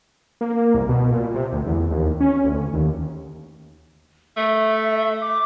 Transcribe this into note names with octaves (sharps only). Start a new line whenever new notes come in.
A#3
C2
B2
A#2
C3
D2
E2
D#2
C#4
D2
D#2
A3 E5
D6